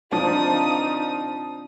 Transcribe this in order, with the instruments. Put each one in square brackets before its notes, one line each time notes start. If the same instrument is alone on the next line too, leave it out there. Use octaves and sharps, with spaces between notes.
[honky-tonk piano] F3 [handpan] C4 D4 F4 [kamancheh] D#4 D#6